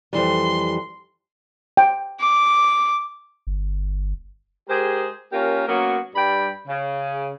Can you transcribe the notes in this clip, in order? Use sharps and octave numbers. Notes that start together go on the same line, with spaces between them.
F2 E3 G3 C6
G5
D6
G1
G#3 G4 G#4 A#4 C5
A#3 C#4 F4 G4 A#4
F#3 A#3 B3 C#4 F#4 A#4
G2 G3 G5 B5
C#3